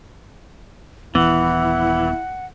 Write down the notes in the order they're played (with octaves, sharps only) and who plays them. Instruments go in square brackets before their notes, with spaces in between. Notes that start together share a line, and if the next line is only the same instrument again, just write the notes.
[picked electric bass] D#1 B3 [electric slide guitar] E3 [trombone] E4 [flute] F#5